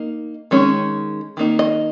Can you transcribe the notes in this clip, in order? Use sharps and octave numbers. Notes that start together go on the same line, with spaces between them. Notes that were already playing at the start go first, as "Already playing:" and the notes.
Already playing: A#3 D#4
D#3 G#3 C#4
D#3 A#3 D#4
D#5